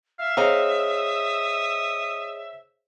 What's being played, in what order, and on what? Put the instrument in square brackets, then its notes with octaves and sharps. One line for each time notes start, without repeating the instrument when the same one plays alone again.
[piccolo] E5 [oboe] F5
[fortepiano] C4 F5 A#5 [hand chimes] G#4 C#5 D#5 [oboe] D#6